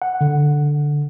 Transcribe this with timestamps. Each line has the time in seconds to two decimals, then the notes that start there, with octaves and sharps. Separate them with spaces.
0.02 F#5
0.21 D3